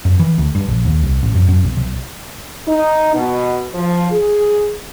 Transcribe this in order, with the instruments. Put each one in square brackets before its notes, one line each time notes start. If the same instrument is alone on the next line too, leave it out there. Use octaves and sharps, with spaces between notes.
[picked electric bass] F#2
E3
D2
G2
A#1
D#2
C2
A1
F#2
F#2
B1
B1
[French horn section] D#4
B2
F3
G#4